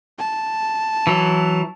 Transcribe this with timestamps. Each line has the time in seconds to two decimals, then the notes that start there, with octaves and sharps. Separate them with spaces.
0.19 A5
1.07 E3 F#3